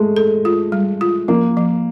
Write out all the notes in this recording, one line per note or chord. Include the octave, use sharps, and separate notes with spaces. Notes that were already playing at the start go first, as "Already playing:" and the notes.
Already playing: G#3 A3
A4
F4
G3
F4
F3 A#3
F3